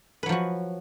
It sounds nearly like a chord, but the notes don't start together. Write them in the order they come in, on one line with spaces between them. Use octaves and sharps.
B4 F#3 F3 F#4